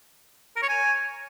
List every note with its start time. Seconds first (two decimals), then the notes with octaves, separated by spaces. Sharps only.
0.56 A#4
0.63 C#5
0.69 G#5